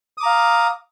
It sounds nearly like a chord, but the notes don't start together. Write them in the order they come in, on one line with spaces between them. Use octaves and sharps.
D#6 D6 A#5 F5